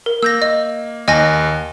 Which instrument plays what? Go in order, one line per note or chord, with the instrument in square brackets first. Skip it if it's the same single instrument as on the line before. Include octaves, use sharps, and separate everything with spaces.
[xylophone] A#4
[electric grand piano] A#3 [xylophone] E6 G6 A#6
[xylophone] D#5
[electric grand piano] D#2 [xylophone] D#5 G#5 A#6